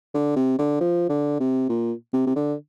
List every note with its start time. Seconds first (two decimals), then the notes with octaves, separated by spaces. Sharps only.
0.14 D3
0.36 C3
0.59 D3
0.81 F3
1.10 D3
1.40 C3
1.69 A#2
2.14 C3
2.27 C3
2.36 D3